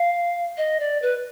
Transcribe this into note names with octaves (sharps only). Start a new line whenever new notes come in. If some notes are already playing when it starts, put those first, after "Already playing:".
Already playing: F5
D#5
D5
B4